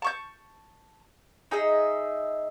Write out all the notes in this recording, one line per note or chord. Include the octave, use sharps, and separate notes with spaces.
A5 C#6 G6
D#4 G#4 D#5 E5